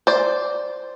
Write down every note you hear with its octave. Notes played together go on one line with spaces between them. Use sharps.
C5 D5